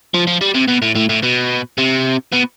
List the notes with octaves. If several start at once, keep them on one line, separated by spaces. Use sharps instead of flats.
F3
F3
G3
C3
B2
A2
A2
A2
B2
C3
B2